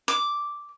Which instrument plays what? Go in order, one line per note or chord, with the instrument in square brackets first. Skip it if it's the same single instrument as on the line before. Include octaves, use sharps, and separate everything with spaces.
[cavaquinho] D6